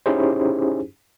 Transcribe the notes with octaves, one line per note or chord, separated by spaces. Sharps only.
C#4 D#4 E4 G4 G#4 C5